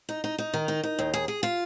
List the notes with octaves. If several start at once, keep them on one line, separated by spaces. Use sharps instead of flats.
D#4
D#4
D#4
D#3
D#4
D#4
D#2
G#4
G#4
F4